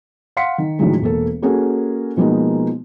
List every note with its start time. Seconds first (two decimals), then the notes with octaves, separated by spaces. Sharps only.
0.37 F5 F#5 C6 B6 C#7
0.58 D#3
0.79 A2 D3 D#3 F3 F#3 G#3
1.02 E1 A#3 A4
1.42 A#3 C#4 F#4 G#4 A4
2.17 B2 F3 G#3 A#3 B3 D#4